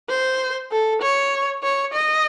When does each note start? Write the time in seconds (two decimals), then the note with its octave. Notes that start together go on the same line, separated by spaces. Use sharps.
0.10 C5
0.72 A4
1.02 C#5
1.63 C#5
1.94 D#5